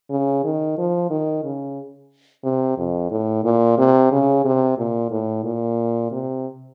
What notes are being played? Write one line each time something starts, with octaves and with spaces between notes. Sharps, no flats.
C#3
D#3
F3
D#3
C#3
C3
F2
A2
A#2
C3
C#3
C3
A#2
A2
A#2
C3